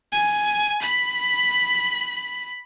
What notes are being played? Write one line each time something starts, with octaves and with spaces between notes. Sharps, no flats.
G#5
B5